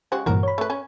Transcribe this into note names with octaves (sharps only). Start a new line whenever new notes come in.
C#3 G#3 F#4 G4 C5
G2 A#2 E3 F#4 A#4
C#5 B5
A3 B4
C#4